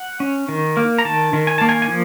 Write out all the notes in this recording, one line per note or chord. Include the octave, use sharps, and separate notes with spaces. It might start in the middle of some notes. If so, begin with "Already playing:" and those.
Already playing: F#5
C#4
D#3
A#3
A#5
D#3 A5
D#3
G#5
A#3 A5
G#5
G#5
F3